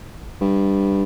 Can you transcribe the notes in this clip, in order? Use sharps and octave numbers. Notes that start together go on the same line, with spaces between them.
G2